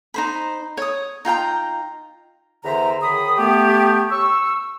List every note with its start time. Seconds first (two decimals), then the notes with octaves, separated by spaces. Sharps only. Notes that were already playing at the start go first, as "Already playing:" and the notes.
0.14 D#4 C5 B5
0.77 C#5 D#6
1.25 D#4 F4 G5 A#5
2.64 E2 D3 C5 E5 A#5
3.02 F#2 D#3 G#4 B5 D#6
3.37 A3 B3 G4
4.11 C#6 E6